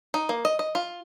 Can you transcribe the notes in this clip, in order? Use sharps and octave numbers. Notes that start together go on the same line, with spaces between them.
D#4
A#3
D#5
D#5
F4